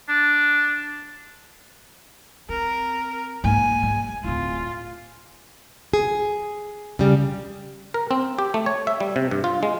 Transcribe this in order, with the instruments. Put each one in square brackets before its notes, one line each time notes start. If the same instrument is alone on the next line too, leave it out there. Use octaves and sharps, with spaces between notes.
[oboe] D4
[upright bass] C4 [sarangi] A#4
[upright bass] G#2 A#3 [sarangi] G#5
[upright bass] G3
[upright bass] D1 E4 [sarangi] F4
[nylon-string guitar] G#4
C#3 G3
[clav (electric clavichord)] A#4
C4
G4
A3
C#5
E5
G3
C3
G2
F4
G#3